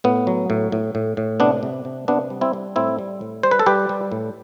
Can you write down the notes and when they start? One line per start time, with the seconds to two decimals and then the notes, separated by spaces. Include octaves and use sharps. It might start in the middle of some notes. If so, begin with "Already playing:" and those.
0.04 A2 B3
0.27 F#3
0.50 A2
0.72 A2
0.95 A2
1.17 A2
1.40 C3 B3 D4
1.63 C3
1.85 C3
2.08 C3 B3 D4
2.30 G3
2.41 C4 E4
2.53 G3
2.76 A2 C4 E4
2.99 G3
3.21 A2
3.43 G3 C5
3.51 B4
3.59 A4
3.66 G3 G4 B4
3.89 G3
4.12 A2